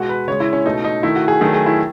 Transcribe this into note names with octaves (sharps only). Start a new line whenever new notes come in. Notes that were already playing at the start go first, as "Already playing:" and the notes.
Already playing: B2 G#3 F#4
B4
C#3 G#3 C#5
E4
C#4
B2 A3 D#4
D#4
D#3 A3 E4
F#4
G#4
D#3 F#3 A3 G#4
G#4
E4